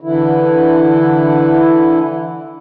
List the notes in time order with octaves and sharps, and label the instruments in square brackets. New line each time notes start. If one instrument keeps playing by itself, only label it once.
[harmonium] D3 E3 E4